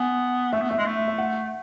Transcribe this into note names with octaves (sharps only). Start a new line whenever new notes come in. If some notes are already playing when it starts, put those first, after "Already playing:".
Already playing: B3 G#5
A3 E5
B3
A3 E5
G#3
A3
E5
F#5